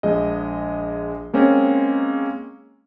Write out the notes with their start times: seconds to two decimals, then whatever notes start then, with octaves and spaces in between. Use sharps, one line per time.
0.03 A#1 G#3 D#5
1.33 G#3 A#3 C4 C#4